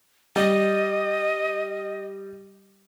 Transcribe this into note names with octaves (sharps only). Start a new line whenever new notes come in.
G3 D#5